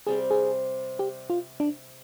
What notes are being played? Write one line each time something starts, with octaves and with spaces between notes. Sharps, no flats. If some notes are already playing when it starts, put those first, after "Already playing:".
C3 G3 C4 G#4
G#4
G4
F4
D4